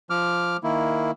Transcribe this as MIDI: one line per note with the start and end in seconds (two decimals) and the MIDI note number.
0.10 0.57 53
0.10 0.57 86
0.10 0.57 89
0.64 1.11 51
0.64 1.11 58
0.64 1.11 64